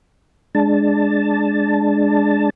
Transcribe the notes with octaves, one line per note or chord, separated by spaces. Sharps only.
G#3 D4 A5